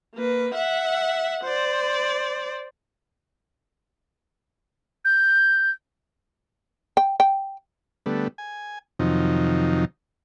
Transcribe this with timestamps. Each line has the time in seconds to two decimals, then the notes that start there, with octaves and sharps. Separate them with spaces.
0.15 A#3 B4
0.54 E5 F#5
1.43 C5 D5
5.05 G6
6.97 G5
7.20 G5
8.06 D3 G3 A3 B3
8.38 G#5
8.99 F2 C3 D#3 F3 F#3 D#4